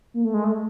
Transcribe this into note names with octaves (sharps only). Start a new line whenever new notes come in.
A#3
A3
G#3
A3